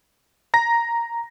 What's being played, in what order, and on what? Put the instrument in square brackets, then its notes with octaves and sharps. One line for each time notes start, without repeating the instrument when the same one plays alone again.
[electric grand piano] A#5 A#6